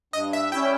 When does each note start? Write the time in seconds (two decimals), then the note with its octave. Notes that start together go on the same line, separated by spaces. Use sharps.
0.13 G2 D#5
0.33 E5
0.52 G3 C#4 E4 G5